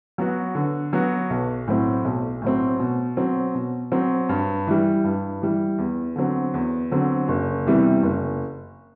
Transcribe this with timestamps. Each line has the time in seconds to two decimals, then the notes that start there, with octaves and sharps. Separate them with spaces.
0.18 F#3 B3 F#4
0.55 D3
0.93 F#3 B3 F#4
1.30 B1
1.67 A2 F#3 C4
2.04 B1
2.42 A2 F#3 C4
2.80 B2
3.17 F#3 C4
3.55 B2
3.92 F#3 C4
4.29 G2
4.67 E3 G3
5.04 G2
5.42 E3 G3
5.78 E2
6.16 D3 F#3 C4
6.54 E2
6.91 D3 F#3 C4
7.28 F#1
7.66 E2 C3 E3 G3
8.03 F#1